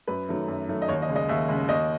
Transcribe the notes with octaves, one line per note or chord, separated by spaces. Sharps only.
F#2 B4
D#3 F#3 A3
F#2
D#3 F#3 A3
D#5
D#2 C#5
D#5
C#3 G#3
D#5
D#2 E5
C#3 G#3
D#2 D#5